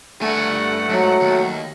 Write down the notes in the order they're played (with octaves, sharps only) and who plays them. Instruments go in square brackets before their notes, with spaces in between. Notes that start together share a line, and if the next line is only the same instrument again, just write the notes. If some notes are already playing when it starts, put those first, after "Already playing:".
[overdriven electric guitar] G2 G#5 [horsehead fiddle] A3 F#5
[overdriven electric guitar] G#2 [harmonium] F#3
[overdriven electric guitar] D#2